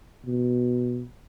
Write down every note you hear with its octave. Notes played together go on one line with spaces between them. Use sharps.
B2